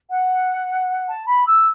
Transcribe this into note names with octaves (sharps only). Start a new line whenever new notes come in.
F#5
A5
B5
E6